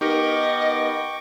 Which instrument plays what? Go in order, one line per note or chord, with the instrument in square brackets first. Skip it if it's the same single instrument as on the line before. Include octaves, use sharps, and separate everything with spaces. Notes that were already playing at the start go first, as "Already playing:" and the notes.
[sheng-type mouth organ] B3 [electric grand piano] D#4 G4 A#4 [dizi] D#5 [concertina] G5 C#6 D6